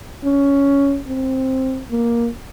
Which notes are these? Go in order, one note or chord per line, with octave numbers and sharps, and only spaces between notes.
C#4
C4
A#3